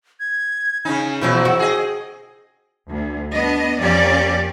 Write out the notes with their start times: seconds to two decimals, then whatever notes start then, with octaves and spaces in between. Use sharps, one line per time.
0.20 G#6
0.85 C#3 C#4 D#4 G#5
1.21 E2 B2 F3 F#3 C#4 E4 G6
1.45 F#4 G5
1.59 G#4 D#5
2.90 D2
3.32 B3 D4 D#5
3.80 F2 A#3 C#4 G4 D5